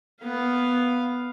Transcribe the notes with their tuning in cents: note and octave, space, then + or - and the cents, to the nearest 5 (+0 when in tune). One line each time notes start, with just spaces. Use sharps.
B3 +0 F5 +0